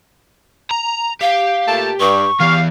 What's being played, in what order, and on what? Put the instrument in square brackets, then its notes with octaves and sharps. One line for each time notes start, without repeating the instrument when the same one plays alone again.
[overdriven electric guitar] A#5
[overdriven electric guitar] G4 [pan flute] F5
[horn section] A#2 A3 A5
[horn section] G2 [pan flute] C#6
[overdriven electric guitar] E3 B3 [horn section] G4 D5 F5